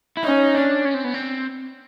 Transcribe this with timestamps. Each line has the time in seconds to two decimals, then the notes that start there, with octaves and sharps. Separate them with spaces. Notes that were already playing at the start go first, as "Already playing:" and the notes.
0.17 E4
0.24 C#4 D#4
0.55 D4
0.85 C#4
0.94 C4
1.04 B3
1.14 C4